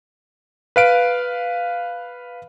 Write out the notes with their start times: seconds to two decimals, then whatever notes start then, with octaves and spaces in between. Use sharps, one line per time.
0.76 B4 F5 D7